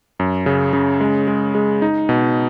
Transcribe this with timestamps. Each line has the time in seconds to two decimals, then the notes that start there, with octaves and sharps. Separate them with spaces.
0.19 F#2
0.46 C#3
0.73 C#3
1.01 G#3
1.28 G#3
1.55 G#3
1.82 D#4
2.09 B2